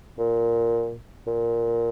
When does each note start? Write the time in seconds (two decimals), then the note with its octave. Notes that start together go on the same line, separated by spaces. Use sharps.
0.18 A#2
1.27 A#2